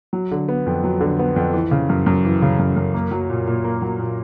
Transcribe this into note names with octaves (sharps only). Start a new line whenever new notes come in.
F#3
D3
B3
F2
F#3
D3
B3
F2
E3
C#3
F#2
F#2
E3
C#3
F#2
F#2
A#3
F#3
A#2
A#2
A#3
F#3
A#2